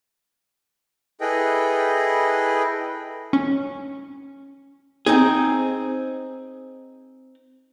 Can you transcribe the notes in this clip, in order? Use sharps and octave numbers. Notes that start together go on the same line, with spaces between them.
E4 G#4 A4 B4 D#5 G5
C#4
C4 D#4 G#4